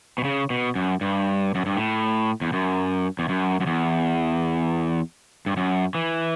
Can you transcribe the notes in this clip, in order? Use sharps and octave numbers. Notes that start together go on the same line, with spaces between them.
B2
C#3
B2
F#2
G2
F#2
G2
A2
E2
F#2
E2
F#2
F#2
E2
G2
F#2
E3